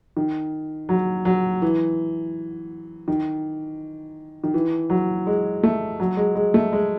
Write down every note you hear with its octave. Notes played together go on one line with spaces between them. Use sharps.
D#3
F#3
F#3
E3
D#3
D#3
E3
F#3
G#3
A3
F#3
G#3
G#3
A3
G#3